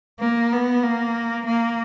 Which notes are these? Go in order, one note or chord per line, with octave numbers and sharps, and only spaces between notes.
A#3
B3
A#3
A#3